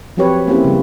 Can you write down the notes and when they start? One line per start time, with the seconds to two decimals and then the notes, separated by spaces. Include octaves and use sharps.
0.17 F3 F#3 C4 G4 B4 C#5
0.47 A#3 C4 C#4 E4 G4
0.65 C#3 G3